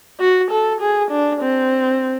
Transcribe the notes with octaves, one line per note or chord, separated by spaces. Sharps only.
F#4
A4
G#4
D4
C4